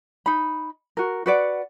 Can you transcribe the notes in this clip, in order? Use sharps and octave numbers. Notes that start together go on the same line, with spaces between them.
D#4 B5
F#4 A#4
F#4 B4 D5 F#5